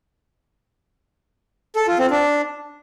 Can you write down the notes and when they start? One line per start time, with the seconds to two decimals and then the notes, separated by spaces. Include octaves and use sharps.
1.76 A4
1.87 F4
1.99 C4
2.11 D4